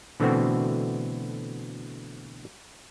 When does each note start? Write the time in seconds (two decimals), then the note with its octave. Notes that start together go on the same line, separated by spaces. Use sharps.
0.20 B2 D3 E3 A3 C4 F#4